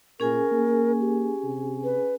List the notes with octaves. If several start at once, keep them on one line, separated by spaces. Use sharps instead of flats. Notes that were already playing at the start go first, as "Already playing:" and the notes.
A#2 C#4 G#4 A#4 G#5
A#3
G4
C3
B4